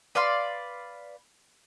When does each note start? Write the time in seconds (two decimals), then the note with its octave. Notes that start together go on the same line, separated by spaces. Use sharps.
0.15 B4 D5 F5 C6